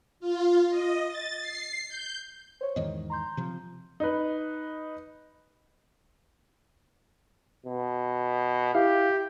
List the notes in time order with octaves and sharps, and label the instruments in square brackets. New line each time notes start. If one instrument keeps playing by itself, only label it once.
[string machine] F4
D#5
A6
C7
G6
[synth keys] C5 C#5
[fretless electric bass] E2 G#2 D#3 [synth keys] D#5
[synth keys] A#5 C6 G6
[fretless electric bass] C3 F3
[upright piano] D#4 B4
[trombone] B2
[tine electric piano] E4 E5 F5 [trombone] G4